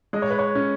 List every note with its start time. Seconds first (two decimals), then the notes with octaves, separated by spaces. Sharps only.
0.13 G#3 D#5
0.22 C#5
0.30 B4
0.39 C#5
0.55 C#4